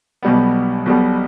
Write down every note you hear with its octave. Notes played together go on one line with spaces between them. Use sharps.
B1 B2 G3 B3
B1 B2 G3 B3